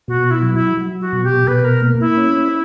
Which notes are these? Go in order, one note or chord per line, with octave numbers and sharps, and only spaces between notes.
B2 F#4
E4
F#3
E4
F#3
F#4
B2
G4
B2 B4
A#4
A#3
E4
C#4